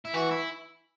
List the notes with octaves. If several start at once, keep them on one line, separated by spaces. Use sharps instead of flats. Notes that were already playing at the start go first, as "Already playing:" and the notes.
E4
E3 F#4
E4